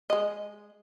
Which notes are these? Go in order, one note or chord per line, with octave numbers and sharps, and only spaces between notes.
G#3 D#5